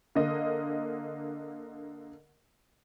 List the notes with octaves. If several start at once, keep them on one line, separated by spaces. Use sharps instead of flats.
D3 A#3 D#5